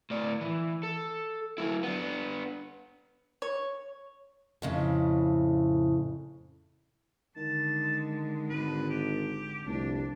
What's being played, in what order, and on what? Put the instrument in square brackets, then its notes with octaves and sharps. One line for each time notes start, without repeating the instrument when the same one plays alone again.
[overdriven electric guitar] A2 D5
E3
A4
F#3 E4
B3 D4
[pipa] C#5
[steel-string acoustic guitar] F2 A2 C#3
[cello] D3 G#3 [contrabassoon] D#3 [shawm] A5
[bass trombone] G#1 [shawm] B4
[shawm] G4
[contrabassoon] F1 [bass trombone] C2 [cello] D4